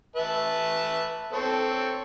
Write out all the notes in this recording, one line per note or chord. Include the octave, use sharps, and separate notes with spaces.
B4 E5 A5
C4 A4 C#5